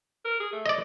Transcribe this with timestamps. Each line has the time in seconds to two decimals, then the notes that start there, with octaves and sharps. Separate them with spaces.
0.25 A#4
0.40 G#4
0.53 A3
0.66 D5 D#5